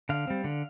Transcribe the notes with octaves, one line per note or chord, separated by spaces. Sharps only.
D3 F5
G3 C4
D3